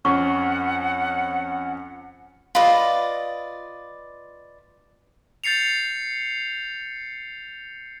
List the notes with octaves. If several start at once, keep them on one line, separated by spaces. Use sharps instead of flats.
F2 C#4 F#5 C#6
F4 B4 D5 D#5
G6 A6 C7 C#7 F7